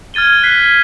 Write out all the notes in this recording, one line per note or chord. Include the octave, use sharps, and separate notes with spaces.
F6 G#6 A6 D#7 G7
F#6 B6 C7